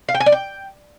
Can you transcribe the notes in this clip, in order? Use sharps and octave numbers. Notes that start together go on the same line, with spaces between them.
F5
G5
G#5
D5
G5